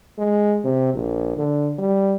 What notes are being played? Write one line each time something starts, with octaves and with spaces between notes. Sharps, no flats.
G#3
C3
A#1
D3
G3